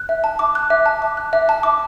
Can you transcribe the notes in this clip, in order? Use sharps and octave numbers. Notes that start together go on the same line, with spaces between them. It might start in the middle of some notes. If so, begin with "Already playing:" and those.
Already playing: F#6
E5
A5
D6
F#6
E5
A5
D6
F#6
E5
A5
D6